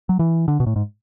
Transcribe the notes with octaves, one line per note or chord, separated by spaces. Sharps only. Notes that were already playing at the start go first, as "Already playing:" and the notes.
F#3
E3
D3
B2
A2
G#2